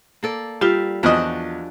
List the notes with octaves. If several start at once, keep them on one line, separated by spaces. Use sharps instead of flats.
A#3 A4 D5
G3 F4 G4 E5 F5
E2 F3 D4 F#4 D#5